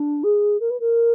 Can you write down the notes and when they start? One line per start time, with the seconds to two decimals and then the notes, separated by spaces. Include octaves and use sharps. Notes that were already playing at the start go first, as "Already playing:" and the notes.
Already playing: D4
0.24 G#4
0.60 A#4
0.70 B4
0.80 A#4